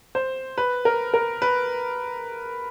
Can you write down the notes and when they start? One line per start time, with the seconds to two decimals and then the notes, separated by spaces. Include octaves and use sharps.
0.15 C5
0.58 B4
0.85 A#4
1.14 A#4
1.42 B4